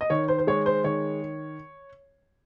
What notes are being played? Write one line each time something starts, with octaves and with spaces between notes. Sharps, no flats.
D#5
D#3 C#5
C5
C5
G#3 C#5
C5
D#3 C#5